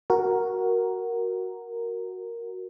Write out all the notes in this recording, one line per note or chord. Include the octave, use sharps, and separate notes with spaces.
F#4 A#4